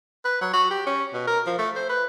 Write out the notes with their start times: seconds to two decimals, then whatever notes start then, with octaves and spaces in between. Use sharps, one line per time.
0.25 B4
0.41 F#3
0.54 F#4
0.70 G4
0.87 C#4
1.14 B2
1.28 A#4
1.47 F3
1.59 A3
1.76 C5
1.90 B4